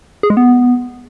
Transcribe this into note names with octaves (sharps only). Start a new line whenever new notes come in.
G#4
G#3
B3